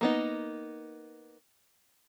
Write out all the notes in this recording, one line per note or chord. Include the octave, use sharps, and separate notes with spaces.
A#3 B3 D#4